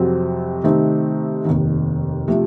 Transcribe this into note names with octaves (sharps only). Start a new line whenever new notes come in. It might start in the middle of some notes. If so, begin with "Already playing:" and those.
Already playing: F2 C3 F#3 C4 F#4
C3 D#3 A3 C4 D#4
F1 D#2 D#3
C3 F3 A3